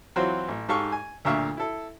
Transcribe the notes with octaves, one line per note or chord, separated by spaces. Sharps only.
E3 F#3 C4 F4 F#4 C5
A1
G#2 G4 A4 F5 C#6
G#5
D2 G2 A#2 E5 F5 C#6
E4 A4